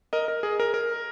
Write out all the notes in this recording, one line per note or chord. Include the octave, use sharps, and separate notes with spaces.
A#4 D#5
A#4
G#4
A#4
A#4